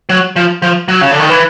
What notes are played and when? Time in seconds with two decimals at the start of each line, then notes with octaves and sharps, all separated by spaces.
0.09 F#3
0.36 F3
0.62 F3
0.88 F#3
1.01 C#3
1.11 D3
1.19 D#3
1.29 E3